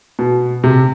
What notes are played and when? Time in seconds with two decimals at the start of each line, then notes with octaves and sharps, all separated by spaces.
0.19 B2
0.64 C3